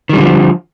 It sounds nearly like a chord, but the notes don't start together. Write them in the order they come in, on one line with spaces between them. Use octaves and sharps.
D#3 G3 D3 F3